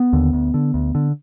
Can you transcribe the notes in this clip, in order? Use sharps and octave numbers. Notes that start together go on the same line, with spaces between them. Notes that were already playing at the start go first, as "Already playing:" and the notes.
Already playing: B3
D#2 D3
D2
D3
D2
D3